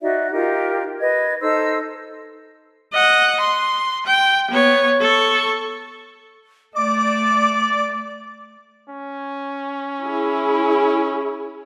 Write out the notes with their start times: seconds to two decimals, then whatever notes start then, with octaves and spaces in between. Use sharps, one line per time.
0.01 D#4 F#4 D5 E5
0.32 D#4 F4 G4 A#4
1.00 B4 D#5 G#6
1.41 D#4 A4 C5 E6
2.93 D#5 F#5
3.40 C6
4.06 G5
4.51 B3 C#5
5.01 A4 C#6
6.76 A3 D5 D6
8.90 C#4
10.03 E4 G#4